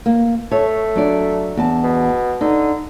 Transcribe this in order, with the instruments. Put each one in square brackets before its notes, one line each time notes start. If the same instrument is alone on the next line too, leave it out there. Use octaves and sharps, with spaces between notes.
[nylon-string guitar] A#3
[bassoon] A3 [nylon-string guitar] C#5
[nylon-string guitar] F#3 D4 D5
E2 A5
[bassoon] B2
[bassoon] D3 [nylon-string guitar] D#4